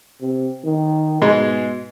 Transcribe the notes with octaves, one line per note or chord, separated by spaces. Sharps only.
C3
D#3
G#2 B2 G#3